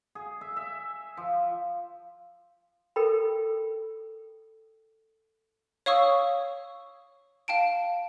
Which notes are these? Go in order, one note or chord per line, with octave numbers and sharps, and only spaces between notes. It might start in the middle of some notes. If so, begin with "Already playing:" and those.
G#4
E5
E5
F3
A4 A#4 G5 B5
C#5 F5 C#6 D#6 E6
F5 G5 A5 D7